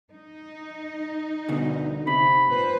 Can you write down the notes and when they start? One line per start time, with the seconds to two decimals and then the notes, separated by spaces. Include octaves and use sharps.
0.11 D#4
1.48 D2 B2 D3
2.07 C3 B5
2.48 A#2 B4 C5